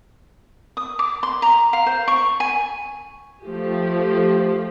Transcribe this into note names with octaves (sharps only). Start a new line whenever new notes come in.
D#6
D6
C6
A#5
F5
C5
C#6
G#5
F3 A3 G4